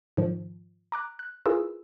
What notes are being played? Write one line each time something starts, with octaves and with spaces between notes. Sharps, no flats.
G#2 D#3 F3
A#5 D6 F#6
F#6
E4 F4 G#4 A#4 B4 E6